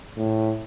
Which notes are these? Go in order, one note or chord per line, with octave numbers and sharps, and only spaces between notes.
A2